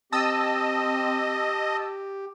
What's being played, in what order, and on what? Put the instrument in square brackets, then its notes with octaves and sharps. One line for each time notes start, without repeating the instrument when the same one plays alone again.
[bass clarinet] C4 [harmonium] G4 [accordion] D#5 [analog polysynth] A5 D#6 E6